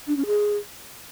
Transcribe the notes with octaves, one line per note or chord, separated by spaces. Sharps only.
D4
C#4
G#4